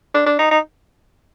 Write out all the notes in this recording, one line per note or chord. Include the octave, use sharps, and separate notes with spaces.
D4
D4
D#4
D#4